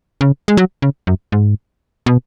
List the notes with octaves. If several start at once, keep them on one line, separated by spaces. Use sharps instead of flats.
C#3
G#3
F#3
C#3
F#2
G#2
B2